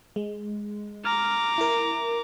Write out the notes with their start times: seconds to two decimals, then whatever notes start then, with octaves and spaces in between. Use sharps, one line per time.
0.16 G#3
1.05 A#5 D6 F6
1.58 E4 A#4